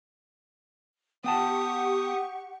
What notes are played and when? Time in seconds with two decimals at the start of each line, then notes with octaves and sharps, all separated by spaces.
1.24 B3 G4 F#5 G5 A5 C#6 D#6